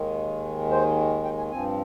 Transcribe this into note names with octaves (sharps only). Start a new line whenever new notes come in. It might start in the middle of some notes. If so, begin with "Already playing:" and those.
Already playing: D#2 D#3 G#3
C5
G5
G#5
G2 F3 C4 G#5